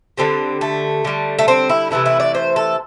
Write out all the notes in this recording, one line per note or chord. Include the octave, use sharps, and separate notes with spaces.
D3 G3 C4
A3
D3 G3
A3
C4
E4
C3 E3 A3 E4
E4
D5
C5
A4